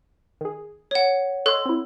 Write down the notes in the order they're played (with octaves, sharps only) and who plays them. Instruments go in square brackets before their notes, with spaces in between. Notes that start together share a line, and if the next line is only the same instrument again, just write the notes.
[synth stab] D#3 G#4
[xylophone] C#5 F#5
[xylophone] A4 F#6 [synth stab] C#5 D#5 C6
[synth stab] C4 E4